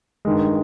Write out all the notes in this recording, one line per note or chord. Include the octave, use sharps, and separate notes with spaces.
G2 D#3 G#3